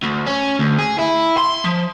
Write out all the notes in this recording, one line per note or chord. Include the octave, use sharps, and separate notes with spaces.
D2
C#4
D2
G#4
E4
C6
F3